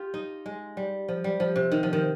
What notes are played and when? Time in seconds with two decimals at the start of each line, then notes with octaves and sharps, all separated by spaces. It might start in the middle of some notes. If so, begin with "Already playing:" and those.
Already playing: F4 G4
0.14 D#4
0.46 G#3
0.77 G3
1.08 F3
1.24 G3
1.40 F3
1.56 C3
1.72 D#3
1.83 F3
1.93 D#3